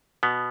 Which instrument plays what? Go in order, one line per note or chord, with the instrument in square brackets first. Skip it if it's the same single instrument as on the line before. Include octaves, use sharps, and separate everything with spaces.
[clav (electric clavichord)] B2 B3